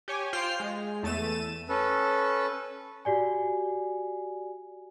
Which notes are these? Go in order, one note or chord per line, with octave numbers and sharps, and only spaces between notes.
G4 C#5 G#5
F4 C5 G5 F6 C7
G#3
E2 A3 A6 D#7 E7
C#4 A4 B4
F#4 G4 D5 G#5